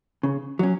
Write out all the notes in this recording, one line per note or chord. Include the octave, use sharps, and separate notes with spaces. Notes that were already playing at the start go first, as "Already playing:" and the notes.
C#3
F#3 C#4